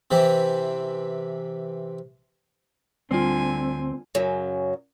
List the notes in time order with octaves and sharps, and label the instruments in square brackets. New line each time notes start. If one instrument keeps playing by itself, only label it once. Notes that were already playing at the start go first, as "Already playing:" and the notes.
[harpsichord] C3 E3 C4
[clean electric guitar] D2 C4 [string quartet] D3 G#5 [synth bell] G3 F4
[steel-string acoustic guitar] F#2 C#3 F#3